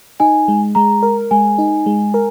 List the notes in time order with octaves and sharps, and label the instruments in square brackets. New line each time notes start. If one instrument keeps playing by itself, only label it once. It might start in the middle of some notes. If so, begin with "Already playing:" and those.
[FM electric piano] D#4 [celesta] G#5
[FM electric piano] G#3
[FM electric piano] G#3 [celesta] A#5
[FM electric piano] A#4
[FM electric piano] G#3 [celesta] G#5
[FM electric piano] D#4
G#3
A#4